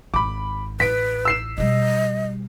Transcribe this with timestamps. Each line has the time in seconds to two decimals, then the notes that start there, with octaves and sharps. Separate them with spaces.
0.14 G#1 B5 D6
0.80 A1 B4 B6 D7
1.25 E6 C7 E7
1.58 B2 G3 D#5